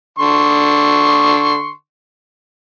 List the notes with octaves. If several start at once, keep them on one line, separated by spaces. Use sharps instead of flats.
D3 C6 C#6